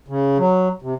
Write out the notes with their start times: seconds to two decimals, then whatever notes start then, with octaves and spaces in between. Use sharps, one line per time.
0.08 C#3
0.38 F#3
0.82 C3